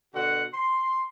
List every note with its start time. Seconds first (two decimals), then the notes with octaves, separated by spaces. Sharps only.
0.14 B2 D3 F#4 F#5
0.53 C6